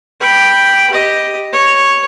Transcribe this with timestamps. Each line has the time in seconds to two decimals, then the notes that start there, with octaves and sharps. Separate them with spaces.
0.21 G5 B5
0.90 G4 D#5
1.53 C#5